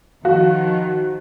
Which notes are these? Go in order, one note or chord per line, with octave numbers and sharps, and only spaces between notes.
D#3 F3 F#4 F5